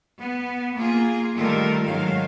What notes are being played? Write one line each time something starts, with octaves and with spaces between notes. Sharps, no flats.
B3
A#3 F4 G#4
D#3 G3 A3 F4 A4 A#4
G#2 D#3 F#3 G#3 F5